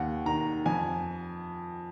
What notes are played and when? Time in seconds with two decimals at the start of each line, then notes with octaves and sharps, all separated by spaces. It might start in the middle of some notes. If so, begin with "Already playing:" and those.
Already playing: D#2 F#5
0.25 D#3 A#5
0.66 F2 G#5